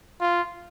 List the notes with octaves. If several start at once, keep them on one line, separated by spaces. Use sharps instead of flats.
F4